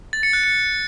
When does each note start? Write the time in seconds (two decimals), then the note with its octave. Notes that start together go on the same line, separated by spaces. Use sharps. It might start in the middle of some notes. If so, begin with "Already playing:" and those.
0.13 A6
0.23 C#7
0.33 F#6
0.43 C#7